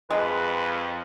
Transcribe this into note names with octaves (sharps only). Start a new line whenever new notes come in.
F2 G#3 B4